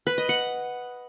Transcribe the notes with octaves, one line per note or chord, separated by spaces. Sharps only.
B4
D#5
F#5